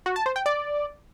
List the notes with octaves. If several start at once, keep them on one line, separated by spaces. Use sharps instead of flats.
F#4
A5
C5
G5
D5